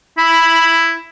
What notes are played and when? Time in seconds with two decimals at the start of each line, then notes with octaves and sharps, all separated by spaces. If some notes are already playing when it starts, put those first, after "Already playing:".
0.17 E4 B5